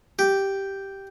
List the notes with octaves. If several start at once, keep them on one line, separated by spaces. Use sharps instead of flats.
G4